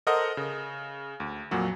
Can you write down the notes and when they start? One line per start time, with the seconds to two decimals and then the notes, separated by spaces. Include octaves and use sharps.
0.07 A4 A#4 C5 D#5 F#5
0.37 C#3
1.20 D2
1.51 F2 A#2 F#3 F#4